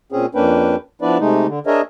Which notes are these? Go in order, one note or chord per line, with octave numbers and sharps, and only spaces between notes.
A#2 C4 C#4 G#4
F2 A#3 C#4 D4 B4 G5
F3 B3 D4 E4 B4 D5
C3 G#3 A3 D#4
D3
D4 G#4 A#4 C#5 D#5 E5